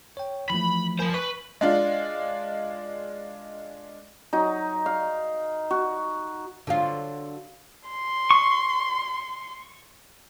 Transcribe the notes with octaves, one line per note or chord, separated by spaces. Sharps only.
C#5 G5
E3 F3 A3 B5
F3 A#4 C5 G#5 B5
B4 C#6
G#3 D4 F4
F#3 D#4
F5
F#4
D3 F#3 F4
C6
C#6